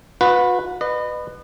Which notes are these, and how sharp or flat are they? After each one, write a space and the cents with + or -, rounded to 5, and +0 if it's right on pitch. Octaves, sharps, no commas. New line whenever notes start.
F#4 -40 B4 +0
B4 +10 D#5 -35